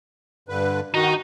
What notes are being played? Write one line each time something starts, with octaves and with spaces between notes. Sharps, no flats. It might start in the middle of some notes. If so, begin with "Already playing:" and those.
G2 D3 B4
D#3 D#4 F#4